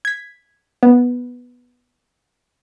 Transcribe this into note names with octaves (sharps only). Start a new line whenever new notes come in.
G#6 B6
B3